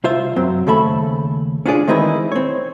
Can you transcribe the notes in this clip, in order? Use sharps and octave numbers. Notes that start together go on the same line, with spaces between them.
C2 F4 C5 E5
F#2 F#3 C4
D#2 C#3 A3 A4 E5 B5
C#4 D4 F4 G#4 D5
D#3 E3 G#3 C4 D#4 E4
C4 C#5